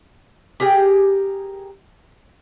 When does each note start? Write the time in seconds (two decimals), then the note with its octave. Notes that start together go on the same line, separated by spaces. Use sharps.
0.60 G4 G#4 A#4 G5